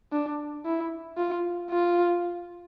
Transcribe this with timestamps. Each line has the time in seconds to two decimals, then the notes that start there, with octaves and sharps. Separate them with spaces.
0.12 D4
0.66 E4
1.17 F4
1.71 F4